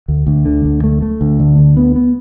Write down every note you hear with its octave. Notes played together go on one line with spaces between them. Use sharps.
D2
D2
D3
D2
A3
A3
D2
D3
D2
B3
B3